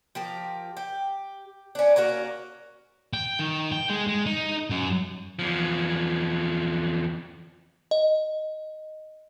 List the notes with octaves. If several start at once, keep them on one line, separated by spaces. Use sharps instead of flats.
F3 G4 A#4
G4
C#4 D4
A#3 C#4 F#4 A#4
G5
D#3
G5
G#3
G#3
D#4
F#2
E2 F3
D#5